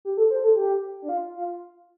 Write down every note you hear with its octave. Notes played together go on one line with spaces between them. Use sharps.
G4
A4
C5
A4
G4
D4
F4
F4